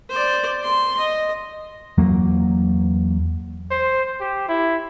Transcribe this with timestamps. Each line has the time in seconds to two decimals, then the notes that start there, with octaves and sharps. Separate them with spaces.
0.10 C5 D5
0.64 C6
0.98 D#5
1.98 E2 F#3 A#3
3.71 C5
4.20 G4
4.49 E4